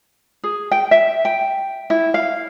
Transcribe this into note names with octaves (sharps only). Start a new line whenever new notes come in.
G#4
G5
E5
G5
E4
F5